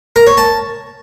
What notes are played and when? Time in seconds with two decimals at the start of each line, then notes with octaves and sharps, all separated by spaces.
0.16 A#4
0.27 C#5
0.37 A5